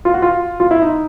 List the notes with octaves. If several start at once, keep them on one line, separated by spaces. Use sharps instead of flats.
F4
F#4
F4
F4
E4
D#4